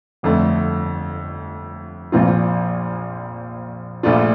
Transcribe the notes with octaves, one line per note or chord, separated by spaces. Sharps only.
G1 F2 D3 A3 C4
A#1 A#2 F3 C4 F4
A#1 A#2 A3 D4 F4